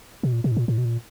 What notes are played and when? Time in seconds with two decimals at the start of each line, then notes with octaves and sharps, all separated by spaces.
0.23 B2
0.32 A#2
0.44 B2
0.52 A2
0.57 A#2
0.68 A2
0.78 B2
0.85 A#2